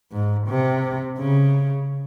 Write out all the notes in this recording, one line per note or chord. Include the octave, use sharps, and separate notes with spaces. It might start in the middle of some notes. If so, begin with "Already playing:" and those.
G#2
C3
C#3